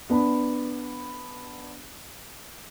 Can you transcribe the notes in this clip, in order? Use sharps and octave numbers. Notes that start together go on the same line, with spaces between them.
B3 D4 B5